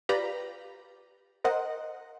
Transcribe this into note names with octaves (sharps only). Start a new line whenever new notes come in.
F4 G4 B4 D5 A#5 B5
A#4 C5 D#5 F#5